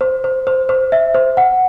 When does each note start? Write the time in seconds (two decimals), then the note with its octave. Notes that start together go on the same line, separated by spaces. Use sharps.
0.01 C5
0.24 C5
0.47 C5
0.69 C5
0.92 E5
1.14 C5
1.37 F#5